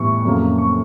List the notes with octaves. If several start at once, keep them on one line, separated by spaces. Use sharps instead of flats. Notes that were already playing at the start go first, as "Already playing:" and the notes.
Already playing: A2 E3 G3 B3 C#6
F2 C#3 F#3 A#3
C#6